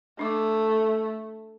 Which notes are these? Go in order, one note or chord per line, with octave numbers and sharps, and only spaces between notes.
A3 D4 D6